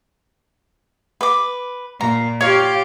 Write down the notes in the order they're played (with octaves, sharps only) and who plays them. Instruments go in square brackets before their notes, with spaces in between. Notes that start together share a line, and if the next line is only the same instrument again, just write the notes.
[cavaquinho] B4 D6
[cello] A#2 [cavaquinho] A#5
[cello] F4 G4 [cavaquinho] C#5 F5